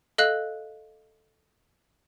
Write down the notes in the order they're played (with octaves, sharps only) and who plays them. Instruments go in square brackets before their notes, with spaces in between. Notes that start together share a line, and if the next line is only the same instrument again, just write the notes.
[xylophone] A4 D#5 F5 F#6 F#7